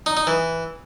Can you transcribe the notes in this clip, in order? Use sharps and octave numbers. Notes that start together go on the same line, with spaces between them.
D#4
D#4
E3